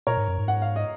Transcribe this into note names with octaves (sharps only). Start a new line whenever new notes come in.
A#2 A#4 C#5
G#2
F#2
G#2
F#5
F5
D#5